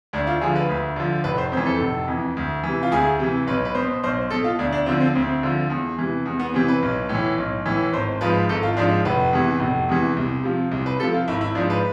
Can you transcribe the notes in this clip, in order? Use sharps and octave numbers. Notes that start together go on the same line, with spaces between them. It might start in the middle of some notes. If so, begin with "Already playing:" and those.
D2 D4
F4
D3 F3 G#4
B4
D2
D3 F3
F1 B4
C5
F2 C5
E3
A4
F1
F2 E3
D2
C3 E3
F4
D2 G#4
C3 E3
B1 B4
B4
B2 C5
B1 C5
B2 A4
F4
D2 D4
D4
D3 F3 C4
C4
D2 C4
D3 F3
E2
C3 E3
E2
B3
C3 E3 C4
B4
B1
A2 E3
B1
A2 E3
G#1 C5
G#2 F3 B4
G#1 A4
F4
G#2 F3 D4
F1 B4
E2 C3 E3
F1
E2 C3 E3
C2
C3 F3
C2
B4
C3 F3 A4
F4
G#1 E4
E4
G#2 F3 D4
B4